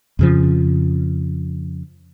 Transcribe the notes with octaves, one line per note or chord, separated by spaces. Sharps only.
F2 C#3 F3